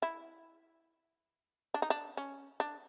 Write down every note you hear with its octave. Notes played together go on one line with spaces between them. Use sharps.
E4
D4
D#4
D4
C#4
D4